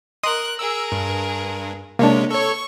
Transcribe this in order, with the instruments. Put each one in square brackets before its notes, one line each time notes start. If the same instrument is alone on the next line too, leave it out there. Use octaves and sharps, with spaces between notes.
[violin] A#4 F#6 [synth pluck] D#5 C6 D#6
[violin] G#4 A#4 [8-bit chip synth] E6
[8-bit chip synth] G2
[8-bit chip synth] C3 G#3 [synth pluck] A#3 D4 [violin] C#5
[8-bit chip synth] A4 C#5 [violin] C#6